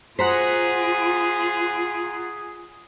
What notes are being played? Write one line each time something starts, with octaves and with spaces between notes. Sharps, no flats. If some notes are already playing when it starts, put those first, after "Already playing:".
F4 F#4 G#4 C5 F#5 A#5 B6